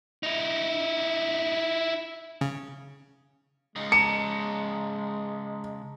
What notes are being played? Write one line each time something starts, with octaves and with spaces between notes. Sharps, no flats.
D#4 E4
C#3
C#3 G#3 D#4
A5 A#5 C#7